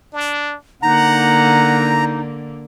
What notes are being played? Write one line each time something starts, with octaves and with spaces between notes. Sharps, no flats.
D4
D3 A#3 D#4 F#5 A#5